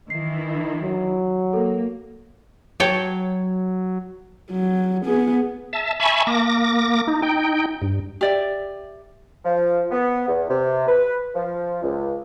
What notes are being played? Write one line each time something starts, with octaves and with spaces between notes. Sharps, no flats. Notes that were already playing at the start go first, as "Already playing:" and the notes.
D#3 E3 E4 C7
F#3
A#3 A4 A#4
F#3 C#5 G5 A5
F#3
B3 G#4
E5 A5
E5 G#5 A5 B5 C#6
A#3 D6 A#6
D#4
D#4 G5
G2
G4 D5 E5
F3
B3
E2
C3
B4
F3
C#2